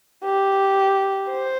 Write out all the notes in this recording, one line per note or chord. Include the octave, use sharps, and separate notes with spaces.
G4
C5